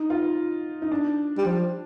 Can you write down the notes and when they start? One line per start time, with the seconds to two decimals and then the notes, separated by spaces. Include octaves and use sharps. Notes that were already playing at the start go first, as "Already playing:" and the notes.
Already playing: D#4
0.10 F4
0.82 D#4
0.91 D4
1.38 G3
1.45 F3